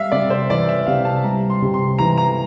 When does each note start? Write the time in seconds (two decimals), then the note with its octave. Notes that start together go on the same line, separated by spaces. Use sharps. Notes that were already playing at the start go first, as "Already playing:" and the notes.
Already playing: G3 E5 F5
0.12 C3 D5
0.30 C5
0.50 E3 D5
0.69 E5
0.87 C3 F5
1.05 A5
1.24 G3 A#5
1.50 C6
1.62 C3
1.74 C6
1.99 E3 A#5
2.18 A#5